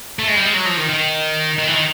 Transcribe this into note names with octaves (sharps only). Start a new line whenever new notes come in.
A3
G#3
G3
G#3
F#3
F3
D#3
D#3
D#3
E3
D#3